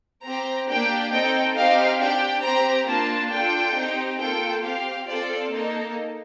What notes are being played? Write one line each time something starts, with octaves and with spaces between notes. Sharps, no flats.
C4 G4 A#5
A#3 D4 G4 G5
C4 D#4 A4 G5
C4 D#4 G4 F5
D4 G4 G5
C4 G4 A#5
A#3 D4 F4 A5
D4 F4 A4 G5
C4 D#4 G4
A#3 F4 A4 G5
C4 G4 F5
C4 F4 A4 D5
A#3 D#4 A4